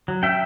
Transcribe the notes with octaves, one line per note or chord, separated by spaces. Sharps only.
F#3
C#4 E5 G5